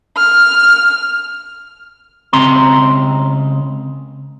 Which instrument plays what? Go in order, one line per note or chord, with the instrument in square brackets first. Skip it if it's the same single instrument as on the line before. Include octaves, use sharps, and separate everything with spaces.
[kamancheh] F6
[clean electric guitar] C#2 C#3 C4 A#5 C6